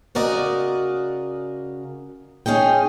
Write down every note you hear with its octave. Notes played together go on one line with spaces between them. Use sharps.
C#3 F#4 A#4 D5 D#5
C#4 D#4 G#4 G5